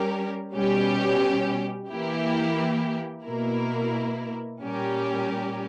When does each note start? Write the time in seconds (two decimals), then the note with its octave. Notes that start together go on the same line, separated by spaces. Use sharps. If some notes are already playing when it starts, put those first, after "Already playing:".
Already playing: G3 C#4 G4 A#4
0.54 B2 G3 C#4 G4
1.90 E3 A#3 E4 G4
3.25 B2 A#3 E4 A#4
4.60 A#2 G3 C#4 G4 A#4